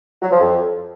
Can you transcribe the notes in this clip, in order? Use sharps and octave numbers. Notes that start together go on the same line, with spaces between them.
F#3
F3
F2